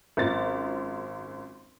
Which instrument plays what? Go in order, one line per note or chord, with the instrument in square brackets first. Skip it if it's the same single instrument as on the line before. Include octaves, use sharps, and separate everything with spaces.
[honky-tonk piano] G#1 F#2 F4 A6